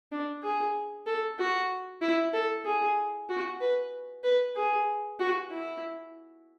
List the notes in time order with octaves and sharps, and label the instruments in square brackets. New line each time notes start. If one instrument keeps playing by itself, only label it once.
[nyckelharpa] D4
G#4
A4
F#4
E4
A4
G#4
F#4
B4
B4
G#4
F#4
E4